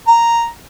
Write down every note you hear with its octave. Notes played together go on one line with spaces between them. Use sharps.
A#5